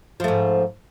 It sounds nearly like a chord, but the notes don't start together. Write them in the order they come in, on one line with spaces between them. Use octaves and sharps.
F3 A3 G#2